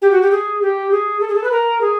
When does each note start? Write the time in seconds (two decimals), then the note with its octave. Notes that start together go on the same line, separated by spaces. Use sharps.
0.02 G4
0.11 F#4
0.22 G4
0.31 G#4
0.62 G4
0.91 G#4
1.20 A4
1.28 G#4
1.35 A4
1.44 B4
1.51 A#4
1.81 G#4